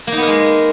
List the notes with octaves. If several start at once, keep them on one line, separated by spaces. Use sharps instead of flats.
G#3 A#3 B3 D#4 A#4